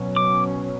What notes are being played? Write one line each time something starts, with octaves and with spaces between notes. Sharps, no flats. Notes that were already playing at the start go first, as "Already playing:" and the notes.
Already playing: B2 F#3 C#4
D6